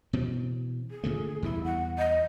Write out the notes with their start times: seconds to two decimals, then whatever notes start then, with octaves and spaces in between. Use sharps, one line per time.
0.13 B2 E3 C4
0.91 G#4
1.04 A#2 D3 A3
1.43 E2 E3 G3 E4
1.64 F#5
1.98 D#5